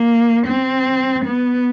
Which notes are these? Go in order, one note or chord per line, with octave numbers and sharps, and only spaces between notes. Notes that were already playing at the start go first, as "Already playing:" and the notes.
Already playing: A#3
C4
B3